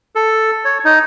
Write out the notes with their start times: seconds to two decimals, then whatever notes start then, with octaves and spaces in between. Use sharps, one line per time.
0.15 A4
0.65 C#5
0.85 D#4